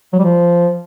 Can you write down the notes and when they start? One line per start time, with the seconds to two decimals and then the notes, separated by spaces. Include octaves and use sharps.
0.13 F#3
0.19 G3
0.24 F3